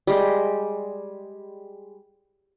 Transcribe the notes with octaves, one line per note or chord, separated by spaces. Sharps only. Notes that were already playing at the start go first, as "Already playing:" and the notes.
G3 G#3